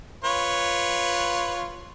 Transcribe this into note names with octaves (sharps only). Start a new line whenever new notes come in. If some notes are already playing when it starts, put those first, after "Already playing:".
F4 B4 C#5